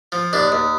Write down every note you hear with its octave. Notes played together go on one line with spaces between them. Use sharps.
F3
D#2 D4
D#2